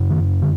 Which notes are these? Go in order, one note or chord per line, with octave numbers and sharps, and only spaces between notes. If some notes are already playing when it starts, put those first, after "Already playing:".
Already playing: F#2 C#3
D#3
D3